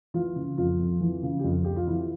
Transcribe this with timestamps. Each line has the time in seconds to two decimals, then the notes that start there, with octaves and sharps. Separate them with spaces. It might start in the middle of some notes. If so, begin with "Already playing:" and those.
0.14 E3 F4
0.36 C#3
0.58 F2 F4
0.79 F2
1.01 E3
1.23 C#3
1.39 G4
1.44 F2 F4
1.64 F2 G4
1.76 F4
1.87 E3 E4